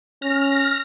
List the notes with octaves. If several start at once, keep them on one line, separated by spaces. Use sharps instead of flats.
C#4 F6 A#6